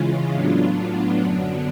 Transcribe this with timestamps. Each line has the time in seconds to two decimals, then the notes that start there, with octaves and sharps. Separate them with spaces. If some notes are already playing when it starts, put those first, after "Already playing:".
Already playing: C#3 E3 G#3 C#4 F4
0.33 A2 F#3 B3 D4 F4
1.18 F#2 D3 F#3 B3 D4